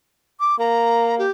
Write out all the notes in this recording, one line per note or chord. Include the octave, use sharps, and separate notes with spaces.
D6
A#3 A#5
G4